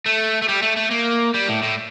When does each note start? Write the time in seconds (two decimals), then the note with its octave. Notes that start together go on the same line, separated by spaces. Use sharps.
0.06 A3
0.42 A3
0.48 G3
0.62 A3
0.76 A3
0.91 A#3
1.34 G3
1.48 A2
1.63 A2